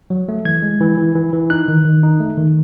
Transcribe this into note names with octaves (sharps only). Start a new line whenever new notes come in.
F#3
A3
E3 G#6
G#3
E3
E3
E3
E3
D#4 F#6
D#3
D#3
D#4
A3
D#3